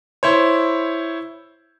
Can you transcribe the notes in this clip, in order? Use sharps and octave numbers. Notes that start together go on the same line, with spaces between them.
E4 C5 C#5